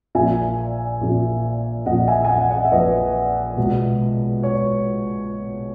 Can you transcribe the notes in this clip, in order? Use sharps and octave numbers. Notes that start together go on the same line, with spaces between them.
A#1 A#2 E5 G#5
A#1 A#2
A#1 A#2 D#5 F#5
E5 G#5
G#5
D#5 F#5
D#5 F#5
E5
A#1 A#2 B4 D#5
C#2 B2
C#5